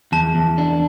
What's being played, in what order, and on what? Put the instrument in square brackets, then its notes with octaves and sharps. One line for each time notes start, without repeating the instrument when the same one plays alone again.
[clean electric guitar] E2 [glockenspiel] A5
[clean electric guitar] E2
D4